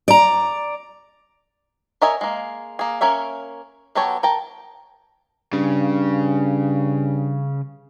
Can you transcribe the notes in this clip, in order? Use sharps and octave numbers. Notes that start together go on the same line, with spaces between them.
D5 A#5
A#4 C#5 D#5 E5 G#5
G#3 A#3
A#3 G#4
A#3 C#4 A#4 C#5 E5
F#3 B3 G4 A4 C#5
A#4 G5 A5
G2 C#3